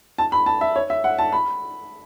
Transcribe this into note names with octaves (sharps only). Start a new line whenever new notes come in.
A5
B5
A5
E5
C#5
E5
F#5
A5
B5